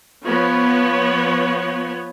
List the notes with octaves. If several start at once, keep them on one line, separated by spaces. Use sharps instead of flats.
F3 B3 C#5